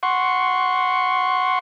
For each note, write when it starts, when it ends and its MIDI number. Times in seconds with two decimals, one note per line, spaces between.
0.03 1.59 78
0.03 1.59 84
0.03 1.59 85